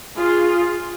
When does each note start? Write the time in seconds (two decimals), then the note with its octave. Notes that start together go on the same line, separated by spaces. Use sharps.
0.17 F4 G#4